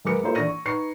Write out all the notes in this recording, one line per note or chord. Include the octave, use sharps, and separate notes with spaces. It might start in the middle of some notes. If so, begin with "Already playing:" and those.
F#2 G#3 A#4 B4 D6 C#7
A#3 E4 F4 A4 C5 C#5
E3 D4 C#6 A#6 D#7
C#6
D#4 B4 C#6 C7 C#7